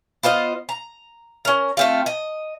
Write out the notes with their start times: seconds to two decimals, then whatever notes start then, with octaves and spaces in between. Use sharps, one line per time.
0.23 B3 F4 C5 D#5
0.69 A#5
1.45 C#4 A#4
1.77 A3 C4 F4
2.06 D#5